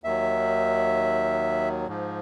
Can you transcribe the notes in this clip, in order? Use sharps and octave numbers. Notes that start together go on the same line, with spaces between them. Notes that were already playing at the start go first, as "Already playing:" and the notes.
D#2 D#3 F#3 E5
G#2 F3